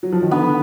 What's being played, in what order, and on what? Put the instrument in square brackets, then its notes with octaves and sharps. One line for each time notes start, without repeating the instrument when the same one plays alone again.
[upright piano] F#3
F3
D#3
[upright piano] D3 [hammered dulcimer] B3